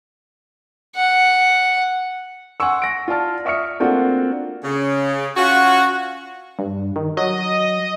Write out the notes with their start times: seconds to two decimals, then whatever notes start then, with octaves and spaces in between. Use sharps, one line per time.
0.96 F#5
2.60 F#5 G#5 C6 C#6 E6
2.82 A#6 D7
3.08 F4 D5 A5 F6
3.45 D5 E5 C#6 D#6 F6 C#7
3.80 A3 A#3 C4 D4 F4 F#4
4.64 C#3
5.37 C#4 F4 F#4
6.59 G2
6.96 D#3
7.17 F#3 D#5